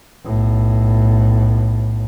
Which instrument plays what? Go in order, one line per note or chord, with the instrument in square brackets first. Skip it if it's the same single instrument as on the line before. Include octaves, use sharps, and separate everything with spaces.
[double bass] B1 A2